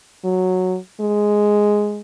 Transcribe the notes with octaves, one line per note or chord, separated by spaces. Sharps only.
F#3
G#3